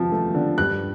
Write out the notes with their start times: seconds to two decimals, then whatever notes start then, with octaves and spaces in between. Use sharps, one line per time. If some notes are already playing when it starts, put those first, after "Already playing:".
Already playing: F2 C3 F3
0.12 A3
0.35 D3
0.58 G2 F#6